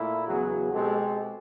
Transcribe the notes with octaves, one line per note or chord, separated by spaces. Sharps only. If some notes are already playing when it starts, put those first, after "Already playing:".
Already playing: A#2 A3 E4
E2 C#3 F#3 B3 F#4 G#4
B2 G#3 C4 G4 A4